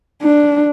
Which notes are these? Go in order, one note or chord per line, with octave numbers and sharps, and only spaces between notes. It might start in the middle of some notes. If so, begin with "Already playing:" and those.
D4